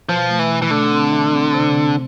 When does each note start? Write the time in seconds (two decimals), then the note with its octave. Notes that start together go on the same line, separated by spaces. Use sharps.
0.09 B2 F3
0.29 A3
0.39 E3
0.50 B2
0.62 E3
0.70 D3 A3
0.92 C4
1.12 E3
1.33 C4
1.54 C3
1.74 C4